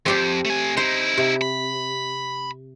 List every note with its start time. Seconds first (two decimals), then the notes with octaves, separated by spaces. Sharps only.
0.06 F2 C4 G4 D5
0.45 A3 G#5
0.77 D#4 E4 C5
1.18 C3
1.42 B5